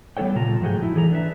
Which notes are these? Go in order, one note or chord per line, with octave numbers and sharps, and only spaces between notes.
G3 B3 D4 A4 C#5 G5
A#2 C#3 F4 A5 A#5
G#2 F3 A3 F#4 G#4 G5
E4
E3 G#4 A4 D5 A#5
D4 B4 E5